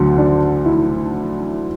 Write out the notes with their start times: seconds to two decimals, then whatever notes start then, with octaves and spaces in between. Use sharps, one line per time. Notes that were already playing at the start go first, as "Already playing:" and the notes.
Already playing: D2 D3 F#3
0.18 D4
0.66 E4